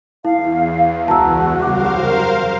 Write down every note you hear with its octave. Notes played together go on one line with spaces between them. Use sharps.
E2 E4 F5
C#2 E3 F#4 A5 A#5 E6
F#2 C#3 G3 A#4 C5 F5 D6